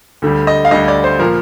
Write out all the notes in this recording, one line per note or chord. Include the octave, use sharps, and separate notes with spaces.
D2 D3 G3
D#5
F5
D2 D3 G3 D#5
D5
C5
A#2 F3 A#4